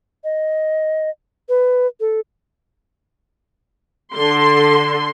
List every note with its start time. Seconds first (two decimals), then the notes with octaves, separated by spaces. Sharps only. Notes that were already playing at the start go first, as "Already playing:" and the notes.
0.24 D#5
1.49 B4
2.00 A4
4.15 D3 C6